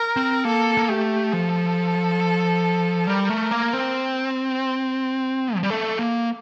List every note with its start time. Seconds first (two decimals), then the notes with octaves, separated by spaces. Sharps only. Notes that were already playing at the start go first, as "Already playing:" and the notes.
Already playing: A#4
0.16 C4
0.45 A#3 A4
0.78 A#3
0.89 A3 G4
1.32 F3 A4
3.07 G3 A#4
3.29 A3
3.51 A#3
3.73 C4
5.56 F3
5.63 G3
5.70 A3
5.99 A#3